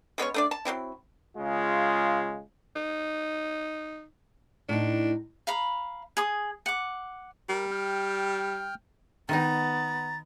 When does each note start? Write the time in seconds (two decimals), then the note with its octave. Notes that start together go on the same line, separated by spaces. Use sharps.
0.18 G#3 B3 C#4 C#5
0.34 A3 D4 D5
0.51 A5
0.65 F#3 G#3 C4 E4
1.37 C#3 G#3 F4
2.76 D#4
4.69 A2 D4 D#4
5.47 F5 A#5 B5
6.17 G#4 D#6
6.66 F#5 D6
7.49 G3 A#4
7.71 G5 F6
9.29 D#3 B3 D#4 A#5 A6